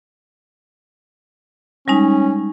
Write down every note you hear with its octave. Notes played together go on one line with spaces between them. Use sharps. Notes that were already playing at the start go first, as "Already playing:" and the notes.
G3 G#3 C#4 D#4